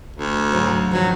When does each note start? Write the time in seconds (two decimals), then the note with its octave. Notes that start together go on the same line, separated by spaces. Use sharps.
0.16 D2
0.37 A5
0.53 G#2 C#3 F#3
0.91 G2 D#3 F3 F#3